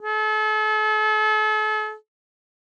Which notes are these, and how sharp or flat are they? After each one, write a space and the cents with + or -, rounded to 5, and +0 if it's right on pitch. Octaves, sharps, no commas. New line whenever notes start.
A4 -40